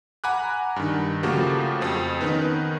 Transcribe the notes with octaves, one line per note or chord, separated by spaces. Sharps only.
F#5 G#5 A#5 B5 D6 F#6
G2 D#3
C#3 F3 A3 A#3 F#4 G4
F2 C4 G#4
D#3 B3 C#4 D#4 B4